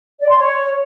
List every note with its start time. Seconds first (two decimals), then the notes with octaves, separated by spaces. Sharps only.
0.21 D5
0.30 C6
0.39 C#5